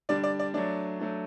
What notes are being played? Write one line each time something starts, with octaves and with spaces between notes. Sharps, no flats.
D3 G3 D4 D5
D5
D5
F#3 A3 D4 D5
F#3 A3 D4